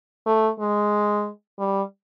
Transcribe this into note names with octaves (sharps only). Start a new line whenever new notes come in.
A3
G#3
G3